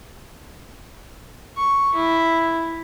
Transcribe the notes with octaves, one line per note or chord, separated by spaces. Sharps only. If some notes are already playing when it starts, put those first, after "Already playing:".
C#6
E4